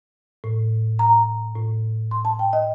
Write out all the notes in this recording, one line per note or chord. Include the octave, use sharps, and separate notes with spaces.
A2
A#5
A2
C6
A5
G5
D#5